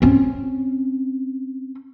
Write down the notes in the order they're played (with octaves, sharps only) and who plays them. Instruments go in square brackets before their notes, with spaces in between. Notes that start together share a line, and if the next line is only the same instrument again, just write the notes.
[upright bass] C4 C#4